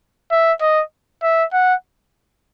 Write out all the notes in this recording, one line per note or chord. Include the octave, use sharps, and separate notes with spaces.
E5
D#5
E5
F#5